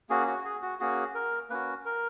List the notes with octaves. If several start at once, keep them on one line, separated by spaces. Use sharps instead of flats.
A#3 C#4 F#4 G#4
F#4
G#4
F#4
A#3 C#4 F#4 G#4
A#4
A#3 C#4 F#4 B4
A#4